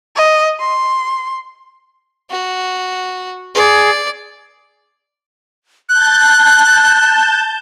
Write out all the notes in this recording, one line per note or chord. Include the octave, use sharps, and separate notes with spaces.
D#5
C6
F#4
G#4 D5
A5 F#6 G6